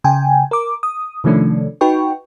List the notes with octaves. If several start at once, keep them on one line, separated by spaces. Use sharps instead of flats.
C#3 G5 G#5
A#4 D6
D#6
C3 D#3 F3 A3 C#4 D4
D#4 F#4 B4 G5 C#6